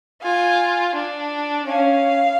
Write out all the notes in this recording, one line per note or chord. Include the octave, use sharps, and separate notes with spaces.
F4 G#5
D4
C#4 F5